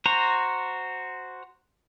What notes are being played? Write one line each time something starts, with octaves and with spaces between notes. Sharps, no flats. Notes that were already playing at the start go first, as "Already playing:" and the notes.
F#4 C5 A#5